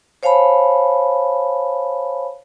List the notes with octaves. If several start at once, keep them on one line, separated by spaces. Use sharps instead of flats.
C5 C#5 F5 G#5 A5 B5